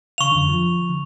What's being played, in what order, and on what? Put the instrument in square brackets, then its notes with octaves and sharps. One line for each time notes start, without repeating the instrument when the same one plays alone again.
[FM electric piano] C#3 F5 [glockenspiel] C#6 F7
[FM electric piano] F2 D3
F3
D3